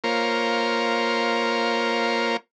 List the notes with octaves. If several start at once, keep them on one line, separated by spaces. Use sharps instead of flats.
A#3 F4 A#4 C5 C#5